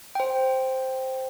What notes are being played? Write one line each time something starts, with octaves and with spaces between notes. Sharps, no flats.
C5 G5